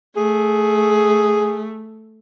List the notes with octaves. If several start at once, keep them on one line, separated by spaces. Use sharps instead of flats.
A3 G#4